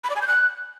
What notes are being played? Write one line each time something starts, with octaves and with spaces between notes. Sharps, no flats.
B5
D5
G#5
G6
F#6